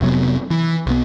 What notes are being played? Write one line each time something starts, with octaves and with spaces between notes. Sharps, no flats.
F1 C3 F#3 B3
E3
B1 B3